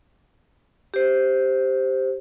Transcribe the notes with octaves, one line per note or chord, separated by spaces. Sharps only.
G4 C5